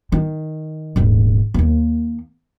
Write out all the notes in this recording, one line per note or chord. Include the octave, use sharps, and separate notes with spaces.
D#3
D#1 G#2
D#2 A#3